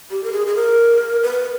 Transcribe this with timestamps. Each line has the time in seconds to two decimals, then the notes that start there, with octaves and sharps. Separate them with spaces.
0.11 G4
0.24 A#4
0.33 G#4
0.47 G#4
0.56 A#4
1.23 B4